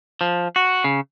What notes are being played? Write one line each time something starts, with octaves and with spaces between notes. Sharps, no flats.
F3
F#4
C#3